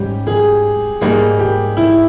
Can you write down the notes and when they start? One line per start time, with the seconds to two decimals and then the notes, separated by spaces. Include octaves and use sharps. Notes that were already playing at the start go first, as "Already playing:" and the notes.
Already playing: G#2 G3 C#4 G4
0.27 G#4
1.01 G#2 G3 A#3 D#4 G#4
1.39 G4
1.77 E4